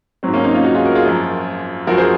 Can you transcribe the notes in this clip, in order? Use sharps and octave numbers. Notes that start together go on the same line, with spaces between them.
G#2 F#3 C4
A#3 C#4
C4 D#4
C#4 F4
D#4 F#4
F4 G#4
F#4 A#4
F4 G#4
F#2 F3
F#2 F3 F#4 A#4
G#4 C5